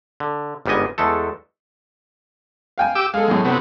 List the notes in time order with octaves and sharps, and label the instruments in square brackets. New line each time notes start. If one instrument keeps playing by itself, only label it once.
[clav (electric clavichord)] D3
G1 G#2 G3 B3 D#5 G#5
E2 G#3 A3 A4
[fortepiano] F5 G5 G#5
[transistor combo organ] G4 D6 E6
[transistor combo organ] G#3 [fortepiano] A4 F5
[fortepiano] F#2 A2
[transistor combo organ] C3 F#3 B3